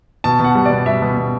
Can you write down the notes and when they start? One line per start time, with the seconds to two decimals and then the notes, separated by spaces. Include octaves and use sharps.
0.24 B2 A5
0.39 B2
0.44 F#5
0.55 G3
0.66 B2 D5
0.86 G3 E5
1.02 B2
1.17 B2